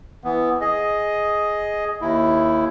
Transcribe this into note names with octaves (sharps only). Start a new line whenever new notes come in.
E3 B3
G#4 D#5
D#2 E4